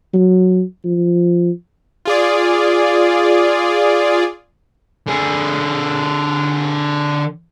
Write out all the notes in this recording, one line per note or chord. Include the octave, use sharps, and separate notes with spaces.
F#3
F3
F4 G#4 D5
D3 G#4